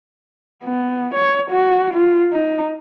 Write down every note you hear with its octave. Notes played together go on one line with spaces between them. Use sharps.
B3
C#5
F#4
F4
D#4